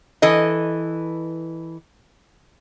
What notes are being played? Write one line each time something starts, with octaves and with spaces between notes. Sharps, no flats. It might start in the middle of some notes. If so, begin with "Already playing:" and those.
E3 A4 D#5